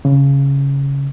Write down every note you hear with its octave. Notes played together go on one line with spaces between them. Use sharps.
C#3